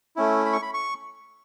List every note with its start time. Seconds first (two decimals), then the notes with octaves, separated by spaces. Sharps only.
0.16 A3 C#4 E4
0.45 B5
0.53 C#6
0.62 B5
0.74 C#6